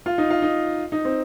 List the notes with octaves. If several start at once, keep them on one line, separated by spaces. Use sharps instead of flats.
F4
D#4
F4
D#4
D#4
C4